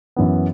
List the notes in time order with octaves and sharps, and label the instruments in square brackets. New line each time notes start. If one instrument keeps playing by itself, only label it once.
[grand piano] F#2 E3 B3